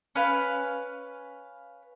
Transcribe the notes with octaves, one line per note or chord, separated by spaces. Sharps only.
C#4 B4 F5